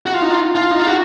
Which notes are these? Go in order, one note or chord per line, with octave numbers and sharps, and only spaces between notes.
F#4
F4
D#4
F4
F4
D#4
F4
F#4